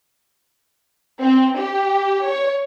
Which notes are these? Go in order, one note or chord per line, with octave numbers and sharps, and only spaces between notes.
C4
G4
C#5